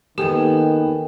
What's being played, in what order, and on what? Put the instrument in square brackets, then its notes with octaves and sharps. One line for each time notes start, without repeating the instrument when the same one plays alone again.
[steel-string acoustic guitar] D#2 B3 [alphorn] D#3 [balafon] G4 [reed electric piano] A4 G5 G#5